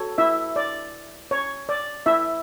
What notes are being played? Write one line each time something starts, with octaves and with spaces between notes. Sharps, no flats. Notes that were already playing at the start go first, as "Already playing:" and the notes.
Already playing: F#4 A4 C#5
E4 E5
D5
C#5
D5
E4 E5